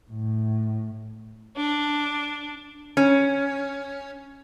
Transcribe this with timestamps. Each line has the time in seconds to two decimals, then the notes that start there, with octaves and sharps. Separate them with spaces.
0.11 A2
1.56 D4
2.97 C#4